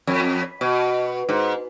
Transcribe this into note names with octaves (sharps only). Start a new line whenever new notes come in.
F2
B2
G#2